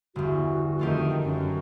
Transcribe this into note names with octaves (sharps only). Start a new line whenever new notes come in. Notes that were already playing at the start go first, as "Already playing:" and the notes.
G1 E2 F#4
F2 D#3 A3 F4 G4
F#2